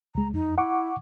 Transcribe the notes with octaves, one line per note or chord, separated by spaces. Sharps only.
C#2 G#3 A#5
F2 D#4
E4 F#5 C#6 D6